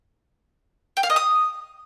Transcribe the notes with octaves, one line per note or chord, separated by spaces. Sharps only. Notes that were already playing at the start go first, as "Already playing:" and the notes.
G5
F5
D#5
D#6